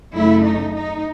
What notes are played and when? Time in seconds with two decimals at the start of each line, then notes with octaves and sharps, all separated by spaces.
0.13 F#2 C#3 F#3 A3 E4
0.44 D#4
0.75 D#4